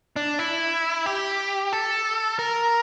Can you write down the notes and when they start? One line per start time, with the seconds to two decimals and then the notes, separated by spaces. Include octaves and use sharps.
0.16 D4
0.39 E4
1.06 G4
1.73 A4
2.39 A#4